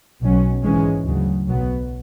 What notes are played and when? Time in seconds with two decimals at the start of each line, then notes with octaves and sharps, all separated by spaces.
0.22 B1 B2 F#3 C#4
0.63 G#1 G#2 E3 G#3 C#4
1.05 D2 C#3 F#3
1.47 B1 B2 F#3 B3